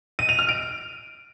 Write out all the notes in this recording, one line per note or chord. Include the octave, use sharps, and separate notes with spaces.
D#7
F7
F6
D7